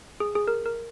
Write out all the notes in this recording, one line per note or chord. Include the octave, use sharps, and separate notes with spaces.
G#4
G#4
A#4
A#4